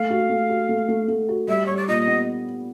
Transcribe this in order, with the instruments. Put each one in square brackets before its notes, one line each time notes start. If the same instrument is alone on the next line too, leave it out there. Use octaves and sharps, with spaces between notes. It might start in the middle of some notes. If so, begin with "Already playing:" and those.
Already playing: [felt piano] A3 [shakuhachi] F5
[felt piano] F#4
A3
F#4
A3
A3
A3
F#4
[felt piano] G3 [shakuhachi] E5
[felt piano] G3 [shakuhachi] C#5
[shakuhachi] D5
[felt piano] A#2 [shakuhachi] D#5
[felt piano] B3